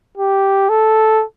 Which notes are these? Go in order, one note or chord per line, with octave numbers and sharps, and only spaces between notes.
G4
A4